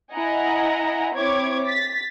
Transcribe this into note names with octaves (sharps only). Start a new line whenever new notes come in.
E4 D#5 F#5 G#5 A#5
C4 E4 C#5 D6 G#6
A6 B6